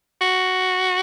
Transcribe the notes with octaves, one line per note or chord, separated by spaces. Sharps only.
F#4